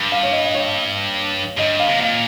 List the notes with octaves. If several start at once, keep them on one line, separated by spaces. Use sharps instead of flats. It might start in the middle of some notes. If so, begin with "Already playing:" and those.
Already playing: G2
F5
C#5
D#5
D#5
C#5
G2 D#5
F5
C3
A#2 F5